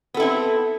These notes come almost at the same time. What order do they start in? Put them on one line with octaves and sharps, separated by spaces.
B3 A4 E4 C4